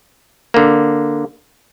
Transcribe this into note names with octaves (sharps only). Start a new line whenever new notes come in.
D3 A#3